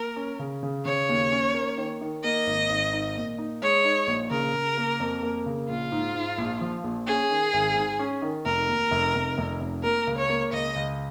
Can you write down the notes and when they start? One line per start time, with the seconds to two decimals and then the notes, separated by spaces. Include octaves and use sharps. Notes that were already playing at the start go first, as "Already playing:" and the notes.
Already playing: A#3 A#4
0.16 C#4
0.39 C#3
0.63 C#3
0.85 C#3 C#5
1.09 D#2
1.32 C#4
1.54 A#3
1.78 D#3
2.01 D#3
2.24 A#3 D#5
2.47 G#1
2.70 G#1
2.93 D#4
3.16 A#2
3.38 D#4
3.62 G#3 C#5
3.85 D#4
4.07 A#1
4.31 C#3 A#4
4.54 C#3
4.77 A#3
5.00 F2
5.23 A#3
5.46 C#3
5.69 A#1 F4
5.92 G#2
6.15 G#2
6.38 A#1
6.61 F3
6.84 A#1
7.07 C#4 G#4
7.30 D#3
7.54 G#1
7.76 G#2
7.99 C#4
8.22 D#3
8.45 F1 A#4
8.68 D#2
8.91 F1
9.15 F1
9.38 F1
9.61 F1
9.83 A#3 A#4
10.07 C#2
10.18 C#5
10.30 A#3
10.52 C#2 D#5
10.76 C#2